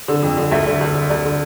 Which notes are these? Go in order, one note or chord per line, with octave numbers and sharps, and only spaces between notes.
D3
F2
D3
D2 E5
D3
D2
D3
D2 D5
D3